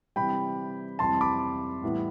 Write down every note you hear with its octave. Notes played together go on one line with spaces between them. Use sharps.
C3 E3 G3 G5 B5
F2 C3 E3 G3 A5 C6
B5 D6
A2 E3 G3 B3